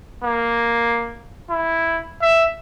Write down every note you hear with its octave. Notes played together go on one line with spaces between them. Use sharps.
A#3
E4
E5